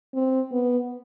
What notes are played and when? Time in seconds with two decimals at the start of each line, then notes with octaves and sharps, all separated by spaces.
0.14 C4
0.52 B3